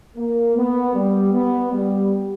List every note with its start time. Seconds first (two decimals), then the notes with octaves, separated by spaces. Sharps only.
0.17 A#3
0.56 B3
0.94 G3
1.33 B3
1.72 G3